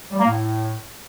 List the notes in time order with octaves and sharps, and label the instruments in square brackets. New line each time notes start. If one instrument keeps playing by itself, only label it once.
[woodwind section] G3
A#3
A2